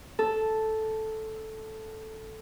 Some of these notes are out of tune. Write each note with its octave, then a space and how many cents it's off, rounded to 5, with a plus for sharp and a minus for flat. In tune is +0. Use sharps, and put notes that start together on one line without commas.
A4 -5